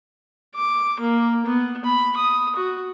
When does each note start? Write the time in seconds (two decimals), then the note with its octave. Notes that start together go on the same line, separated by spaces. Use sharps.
0.55 D6
0.99 A#3
1.45 B3
1.85 B5
2.16 D#6
2.56 F#4